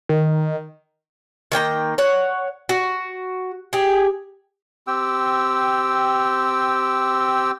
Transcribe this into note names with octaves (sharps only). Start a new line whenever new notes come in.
D#3
D#3 A#3 G5 A#5
C#5 F#5
F#4
G4 G#4
C4 G4 G5 E6